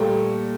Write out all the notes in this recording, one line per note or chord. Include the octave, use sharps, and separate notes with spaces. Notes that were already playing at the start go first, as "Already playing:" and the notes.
Already playing: A#2 G3 A3 A#3